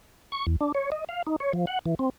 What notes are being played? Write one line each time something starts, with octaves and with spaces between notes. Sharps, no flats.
C#6
E2
D4
C#5
D#5
F5
D#4
C#5
F3
F#5
E3
C4